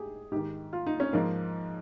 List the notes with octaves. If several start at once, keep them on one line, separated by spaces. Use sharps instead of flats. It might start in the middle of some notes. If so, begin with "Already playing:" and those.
Already playing: G#2 G4 G#4
G#2 D#3 G4
F4
D#4
C#4
G#2 F3 A#3